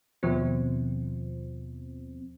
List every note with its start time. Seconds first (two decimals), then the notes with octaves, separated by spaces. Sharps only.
0.23 D#2 B2 F3 C4